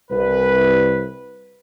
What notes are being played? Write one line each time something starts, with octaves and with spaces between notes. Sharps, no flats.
C2 B4